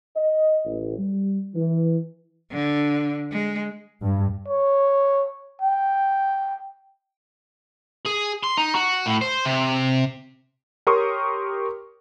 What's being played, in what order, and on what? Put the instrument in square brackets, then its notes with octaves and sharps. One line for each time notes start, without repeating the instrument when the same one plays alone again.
[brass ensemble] D#5
A1
G3
E3
[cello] D3
G#3
[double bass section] G2
[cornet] C#5
G5
[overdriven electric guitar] G#4
C6
D#4
F#4
A2
C5
C3
[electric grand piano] G4 A#4 C#5 C6 C#6 D#6